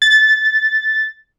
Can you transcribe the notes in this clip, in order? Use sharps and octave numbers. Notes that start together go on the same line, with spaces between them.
A6